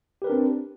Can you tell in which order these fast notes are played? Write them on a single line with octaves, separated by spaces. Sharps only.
G4 B4 A#4 D4 C4